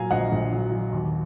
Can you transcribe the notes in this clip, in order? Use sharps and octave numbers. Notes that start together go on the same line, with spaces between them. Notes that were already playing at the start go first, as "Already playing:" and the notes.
Already playing: A#2 F#3 F5 G#5 A#5
A#1 D#5 F#5
A#1
F#3
F#3
D#2